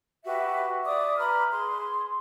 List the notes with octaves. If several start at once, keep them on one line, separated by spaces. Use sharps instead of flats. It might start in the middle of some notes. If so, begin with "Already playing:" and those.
F#4 G4 B4 E5
D5 E5 D6 D#6
B4 A#5 B5 F6
G#4 C6